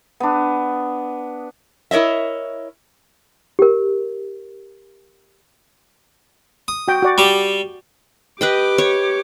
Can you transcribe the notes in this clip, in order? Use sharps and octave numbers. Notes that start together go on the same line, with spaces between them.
B3 D4
E4 A#4 C#5 D#5 E5
G4 A#4
D#6
F#4 G5
F#4 D5
G3 G4
G4 B4 D#5 G5 D6
C#5